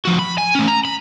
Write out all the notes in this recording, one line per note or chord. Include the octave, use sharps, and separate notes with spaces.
F3 F#4
B5
G#5
A3 C#4
A#5
B5